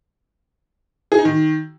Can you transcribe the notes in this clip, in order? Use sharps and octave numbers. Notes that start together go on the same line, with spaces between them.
G#4
D#4
D#3